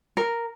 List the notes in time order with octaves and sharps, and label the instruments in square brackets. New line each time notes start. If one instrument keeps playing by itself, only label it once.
[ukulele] A#4